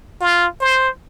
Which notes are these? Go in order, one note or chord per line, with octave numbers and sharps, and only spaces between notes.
F4
C5